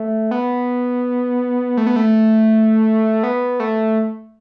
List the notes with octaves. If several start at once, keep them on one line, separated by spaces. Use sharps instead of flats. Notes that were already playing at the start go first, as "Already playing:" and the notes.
Already playing: A3
B3
A3
B3
A3
B3
A3